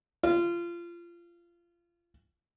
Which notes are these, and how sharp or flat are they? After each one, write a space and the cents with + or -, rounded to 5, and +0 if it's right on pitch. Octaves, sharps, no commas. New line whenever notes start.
F4 -25